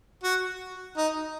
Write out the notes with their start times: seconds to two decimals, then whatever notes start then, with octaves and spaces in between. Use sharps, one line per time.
0.23 F#4
0.97 D#4